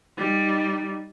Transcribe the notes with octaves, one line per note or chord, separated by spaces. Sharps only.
G3 D#4